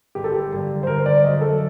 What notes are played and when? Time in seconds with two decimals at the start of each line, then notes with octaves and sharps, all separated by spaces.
0.15 G1 G4
0.24 A4
0.34 G4
0.51 G2 D3 G3 A#3
0.83 C5
0.87 D3 A#4
0.99 C5
1.06 D5
1.24 F#3 A3 D4 F#4 D#5
1.41 A4